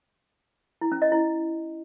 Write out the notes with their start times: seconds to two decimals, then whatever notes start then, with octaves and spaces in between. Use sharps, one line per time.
0.81 E4
0.92 C#4
1.02 D#5
1.12 E4